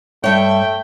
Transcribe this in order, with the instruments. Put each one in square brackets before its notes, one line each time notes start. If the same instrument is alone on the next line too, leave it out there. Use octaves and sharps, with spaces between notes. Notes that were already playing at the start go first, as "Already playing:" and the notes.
[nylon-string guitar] G2 C#5 [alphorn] A3 [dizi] E5 [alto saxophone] G5